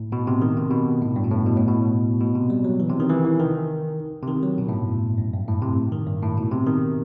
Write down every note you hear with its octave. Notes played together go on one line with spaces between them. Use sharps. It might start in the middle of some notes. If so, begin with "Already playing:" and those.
Already playing: A2
B2
C3
D#3
C3
B2
A2
G2
B2
A2
B2
A2
B2
B2
C3
G3
F#3
E3
C3
D#3
E3
E3
D#3
C3
D#3
F#3
B2
A2
G2
F#2
G2
A2
C3
D#3
G2
A2
B2
C3
D#3